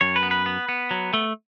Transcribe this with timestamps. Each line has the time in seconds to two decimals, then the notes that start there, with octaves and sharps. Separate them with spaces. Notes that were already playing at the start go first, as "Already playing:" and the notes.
0.01 F#2 C#5
0.16 B4
0.23 B3
0.31 B4
0.46 B3
0.69 B3
0.91 F#3
1.14 A3